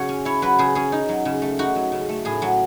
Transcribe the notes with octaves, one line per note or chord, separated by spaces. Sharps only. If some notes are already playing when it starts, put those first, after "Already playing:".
Already playing: C#3 F#3 C#5
C#4
E4 C#5
F#3 B4
C#3 G#4
C#4 G#4
D#4
F#3
C#3
A3
D#4 F#4
F#3
C#3
A3
A2 G#4
F#3